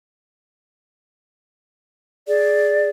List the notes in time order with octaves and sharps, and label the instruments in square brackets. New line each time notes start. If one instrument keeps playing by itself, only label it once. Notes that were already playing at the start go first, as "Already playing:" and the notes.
[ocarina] G#4 [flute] D5